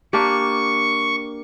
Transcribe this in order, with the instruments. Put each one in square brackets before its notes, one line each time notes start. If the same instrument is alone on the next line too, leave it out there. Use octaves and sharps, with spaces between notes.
[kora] A#3 D4 G4 [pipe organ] C#6